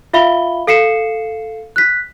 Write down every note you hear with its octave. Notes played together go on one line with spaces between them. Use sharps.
F4 E5 F5 B5 G7
A4 F5 C7 C#7 E7
F#6 B6